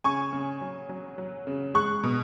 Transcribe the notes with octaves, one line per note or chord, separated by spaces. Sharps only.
C#3 G#5 C#6
C#3
F#3
F#3
F#3
C#3
G#3 C#6 F#6
B2